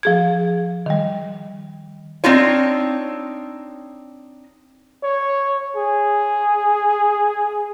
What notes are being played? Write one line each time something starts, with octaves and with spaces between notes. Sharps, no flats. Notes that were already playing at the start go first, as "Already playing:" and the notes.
F3 G#4 G#6
D#3 G3
C4 D4 D#4 F4 C#5
C#5
G#4